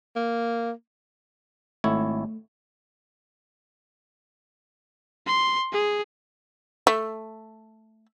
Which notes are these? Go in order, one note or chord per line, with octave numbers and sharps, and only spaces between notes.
A#3
G#1 A3 E4 C#5
C6
G#4
A3